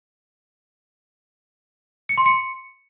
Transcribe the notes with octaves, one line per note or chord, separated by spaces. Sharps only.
C#7
C6
C#7